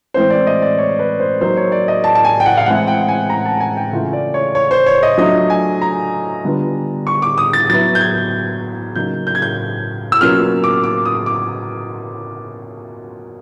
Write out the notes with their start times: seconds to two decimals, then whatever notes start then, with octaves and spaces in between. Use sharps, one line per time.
0.14 A2 E3 G#3 C4 C5
0.30 D5
0.47 D#5
0.62 D5
0.78 C#5
0.99 B4
1.20 C5
1.41 F#3 A#3 D#4 C5
1.57 C#5
1.72 D5
1.88 D#5
2.04 A5
2.15 A5
2.25 G#5
2.40 G5
2.46 F#5
2.57 F5
2.66 A2 E3 G#3 C4 E4 F#5
2.87 G5
3.08 G#5
3.30 A#5
3.45 A5
3.60 G#5
3.77 G5
3.92 C#3 E3 A3 C#4 F4
4.13 D5
4.34 C#5
4.55 C#5
4.71 C5
4.86 C#5
5.03 D#5
5.18 F#3 A3 D4 F4 D#5
5.50 G#5
5.81 A#5
6.44 D3 G3 B3 D4 F4
7.07 C#6
7.22 D6
7.38 D#6
7.53 A6
7.69 F#3 B3 E4 A6
7.95 G6
8.01 G#6
8.95 C#3 F#3 A#3 D#4 G6
9.27 G6
9.35 G#6
9.42 G6
10.12 E6
10.21 B2 F#3 A#3 C#4 F4 F6
10.64 D6
10.84 D6
11.05 D#6
11.26 D6